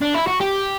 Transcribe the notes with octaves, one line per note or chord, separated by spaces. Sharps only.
D4
E4
F#4
G4